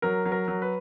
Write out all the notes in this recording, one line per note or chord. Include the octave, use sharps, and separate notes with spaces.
F#3 A#4
F#3
A#4
F#3
B4